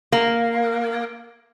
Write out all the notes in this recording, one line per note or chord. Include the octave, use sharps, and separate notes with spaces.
A#3